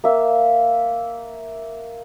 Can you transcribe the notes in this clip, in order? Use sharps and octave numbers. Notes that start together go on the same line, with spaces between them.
A#3 E5